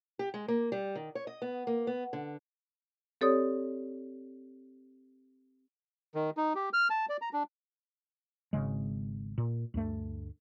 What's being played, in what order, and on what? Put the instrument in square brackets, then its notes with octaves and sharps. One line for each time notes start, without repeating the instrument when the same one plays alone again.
[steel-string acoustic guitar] G4
G#3
A#3
G3
D#3
C#5
D#5
B3
A#3
B3
D3
[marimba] C4 G4 A4 C#5 D5 D#6
[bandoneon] D#3
D#4
G4
F6
A5
D5
A#5
D4
[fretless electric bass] G#1 C#3 G#3
A#2
D2 G2 A3